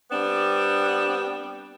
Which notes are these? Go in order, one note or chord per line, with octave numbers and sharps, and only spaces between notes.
G3 B3 C4 D4